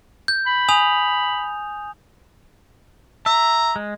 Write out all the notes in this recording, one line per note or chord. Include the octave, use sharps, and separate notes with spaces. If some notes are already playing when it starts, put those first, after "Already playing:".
G6
B5
G#5 D#6 F7
E5 A#5
G#3